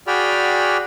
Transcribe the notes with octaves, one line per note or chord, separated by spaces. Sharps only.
F#4 G#4 D5 G5 B5 F6